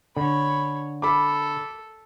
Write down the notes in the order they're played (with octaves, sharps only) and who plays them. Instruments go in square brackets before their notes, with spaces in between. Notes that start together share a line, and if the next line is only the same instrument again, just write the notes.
[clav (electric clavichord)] D3 [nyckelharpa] C#5 B5
[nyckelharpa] A4 [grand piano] B5 D6